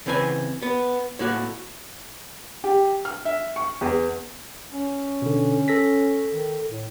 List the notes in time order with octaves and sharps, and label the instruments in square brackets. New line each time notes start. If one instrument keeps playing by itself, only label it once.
[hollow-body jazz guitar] C#3 E3 C4 B4 C5 G#5
B3
A2 A#3 F#4
[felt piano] G4
F6
E5
C#6
E2
[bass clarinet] C#4
[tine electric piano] B2 D3
A4 A#6 B6
[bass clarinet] D#3
A2